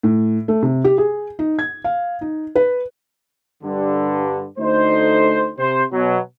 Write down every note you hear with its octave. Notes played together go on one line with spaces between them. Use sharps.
A2
A3
C3
G4
G#4
D#4
G#6
F5
D#4
B4
G2 D3
D2 A3 D#4 A4 C5
C3 C5
B2 F#3